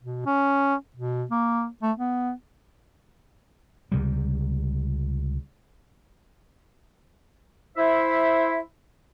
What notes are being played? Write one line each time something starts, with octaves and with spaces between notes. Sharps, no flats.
B2
C#4
B2
A#3
A3
B3
C#2 C3 G3
E4 C5 E5